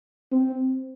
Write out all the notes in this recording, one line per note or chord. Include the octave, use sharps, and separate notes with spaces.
C4